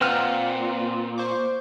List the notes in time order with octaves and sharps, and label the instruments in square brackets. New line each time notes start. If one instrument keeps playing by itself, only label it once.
[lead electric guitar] A#2 [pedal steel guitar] C4 F6 [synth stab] B4 F#5 A#5
[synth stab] C5 C#6 D6